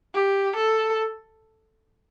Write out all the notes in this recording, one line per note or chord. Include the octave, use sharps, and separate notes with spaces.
G4
A4